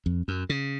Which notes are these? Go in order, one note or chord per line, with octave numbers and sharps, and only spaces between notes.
F2
F#2
C#3